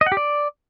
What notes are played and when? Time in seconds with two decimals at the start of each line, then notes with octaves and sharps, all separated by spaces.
0.01 D#5
0.06 F#5
0.12 G4
0.17 D5